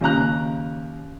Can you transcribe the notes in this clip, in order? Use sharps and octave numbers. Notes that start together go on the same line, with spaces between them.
D#2 C#3 A#5 F#6